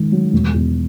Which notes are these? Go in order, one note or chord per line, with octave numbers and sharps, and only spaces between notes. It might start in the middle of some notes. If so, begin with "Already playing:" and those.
Already playing: G#2 D#3
F#3
E1
E2